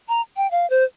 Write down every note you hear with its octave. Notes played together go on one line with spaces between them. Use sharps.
A#5
G5
F5
C5